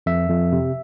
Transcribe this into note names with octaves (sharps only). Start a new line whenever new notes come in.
F2 E5
F2
C3